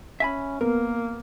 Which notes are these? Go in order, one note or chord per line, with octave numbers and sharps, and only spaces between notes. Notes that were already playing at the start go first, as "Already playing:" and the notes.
C#4 E5 G#5 B5
A#3 B3 A#4